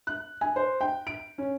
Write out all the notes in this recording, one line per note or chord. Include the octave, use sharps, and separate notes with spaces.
F#6
G#5
C5
G5
D7
C#4